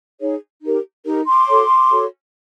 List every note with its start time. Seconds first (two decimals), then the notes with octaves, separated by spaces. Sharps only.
0.19 D#4 G#4 C#5
0.62 D#4 G4 A#4
1.05 D#4 G4 A#4
1.26 C6 D6
1.47 F#4 A4 C#5
1.91 F#4 A4 C#5